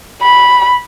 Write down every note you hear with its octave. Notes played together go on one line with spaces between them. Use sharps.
B5